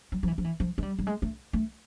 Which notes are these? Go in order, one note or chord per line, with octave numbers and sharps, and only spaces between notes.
F#3
F3
E3
F3
E3
F3
G#3
G3
G3
G#3
A3
A3